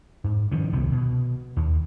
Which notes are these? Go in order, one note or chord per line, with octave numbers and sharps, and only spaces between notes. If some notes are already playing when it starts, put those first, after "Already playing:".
G#2
D#3 F3 G3 C#4
D#1 C2 C3 B3
B2
D#2